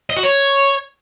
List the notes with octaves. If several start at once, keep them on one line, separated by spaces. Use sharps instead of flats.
D#5
F#4
C#5